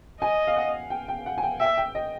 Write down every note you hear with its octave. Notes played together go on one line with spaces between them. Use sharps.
D#5 G#5
F5
F#5
G5
G5
F#5
G#5
G5
E5 G5
G5
D#5